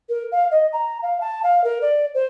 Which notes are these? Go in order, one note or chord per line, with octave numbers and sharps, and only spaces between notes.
A#4
F5
D#5
A#5
F5
A5
F5
A#4
D5
C5